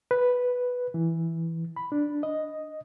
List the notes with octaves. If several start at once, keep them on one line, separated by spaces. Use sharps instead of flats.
B4
E3
B5
D4
D#5